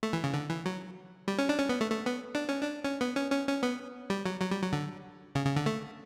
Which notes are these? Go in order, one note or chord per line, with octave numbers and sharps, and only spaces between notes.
A3
E3
C#3
D3
E3
F#3
G3
C#4
D4
C#4
B3
A3
A3
B3
D4
C#4
D4
C#4
B3
C#4
C#4
C#4
B3
G3
F#3
F#3
G3
F#3
D3
C#3
C#3
D3
A3